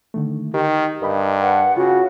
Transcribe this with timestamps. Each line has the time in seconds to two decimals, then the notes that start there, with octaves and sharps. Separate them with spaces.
0.14 D3 D#3 A3
0.54 D#3 G4
1.02 G2 A#4 D#5 B5
1.41 B4 F#5 A5
1.77 C#3 F4 F#4